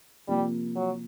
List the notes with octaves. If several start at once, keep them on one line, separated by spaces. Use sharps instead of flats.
C3 F3 G3 A#3
F#3